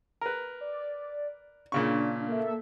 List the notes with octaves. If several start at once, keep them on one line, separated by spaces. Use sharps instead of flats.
A#4 B4
D5
A#2 C#3 D4 C#6
A#3 A4 E5